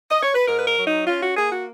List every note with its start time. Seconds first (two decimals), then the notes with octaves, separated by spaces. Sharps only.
0.10 D#5
0.23 C#5
0.35 B4
0.48 G#2 A#4
0.59 B4
0.68 A#4
0.77 F#3
0.88 D#4
1.07 C#4 F4
1.22 F#4
1.37 A#3 G#4
1.52 F#4